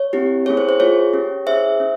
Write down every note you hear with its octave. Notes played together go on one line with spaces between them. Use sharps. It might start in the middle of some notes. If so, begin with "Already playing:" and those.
Already playing: C#5
C4 E4 G4
A#3 C#4 E4 G#4 C#5
C5
C5
A#3 F4 G#4 C#5
C#4 G4
C#4 E4 G#4 C5 E5
C#4